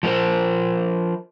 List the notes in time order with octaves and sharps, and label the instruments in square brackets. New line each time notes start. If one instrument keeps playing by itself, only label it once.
[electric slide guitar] F3 G#3 B3 A#4 C5